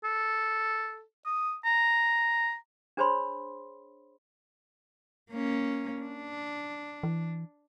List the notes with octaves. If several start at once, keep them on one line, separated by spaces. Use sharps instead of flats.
A4
D#6
A#5
D4 G#4 C5 C#5 B5 C6
A#3 C#4
D4
E3